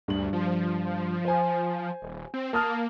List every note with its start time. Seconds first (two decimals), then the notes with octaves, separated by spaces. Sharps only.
0.08 D2 G2 F#7
0.33 F3
1.25 C5 G#5
2.02 D#1
2.34 C4
2.53 A#3 A5 D#6 F6